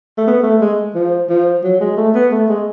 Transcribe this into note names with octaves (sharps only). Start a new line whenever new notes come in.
A3
B3
A3
G#3
F3
F3
F#3
G#3
A3
B3
A3
G#3